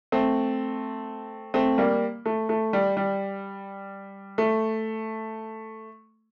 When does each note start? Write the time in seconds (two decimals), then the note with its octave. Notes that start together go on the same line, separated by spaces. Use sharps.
0.12 A3 C4
1.54 A3 C4
1.78 G3 A#3
2.26 A3
2.49 A3
2.73 G3
2.97 G3
4.38 A3